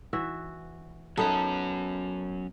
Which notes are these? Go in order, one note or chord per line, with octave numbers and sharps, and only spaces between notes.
E3 F#4 E5
F#3 B3 C#4 D#4 A4 B4